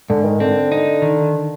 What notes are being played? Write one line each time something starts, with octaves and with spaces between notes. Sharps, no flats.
G#2 D3
D#3
D3 C4
D#4
D#3